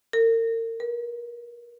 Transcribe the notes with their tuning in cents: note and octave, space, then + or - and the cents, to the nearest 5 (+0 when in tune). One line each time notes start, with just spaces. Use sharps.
A#4 -40
A#4 +35